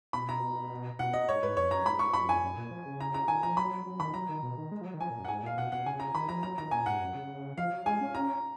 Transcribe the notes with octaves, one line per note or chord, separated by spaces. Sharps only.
B2 B5
A#5
B2 F#5
D#5
G#2 C#5
G#2 B4
F2 C#5
F#2 A#5
G#2 B5
C#6
F#2 B5
F2 G#5
F#2
A#2
F3
C#3
A#5
A#5
D#3 G#5
F3 A#5
F#3 B5
F#3
D#3 B5
F#3 A#5
D#3
B2
D#3
G#3
F3
F#3
D#3
F3 G#5
A#2
F#2
F#5
G#2 G#5
A#2 F5
B2 F#5
B2 F#5
C#3 G#5
A#5
D#3 B5
F3 A#5
F#3 A#5
D#3 A#5
A#2 G#5
G#2 F#5
F#2
C#3
F3 F5
F#3
G#3 G#5
C#4
A#5